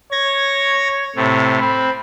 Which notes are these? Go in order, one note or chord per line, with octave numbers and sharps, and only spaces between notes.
C#5 G#6 A#6
A2 C3
C4 B5